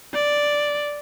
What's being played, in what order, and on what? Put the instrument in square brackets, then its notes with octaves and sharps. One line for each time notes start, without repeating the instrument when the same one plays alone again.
[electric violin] D5